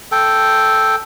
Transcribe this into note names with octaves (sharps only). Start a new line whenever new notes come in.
A4 G5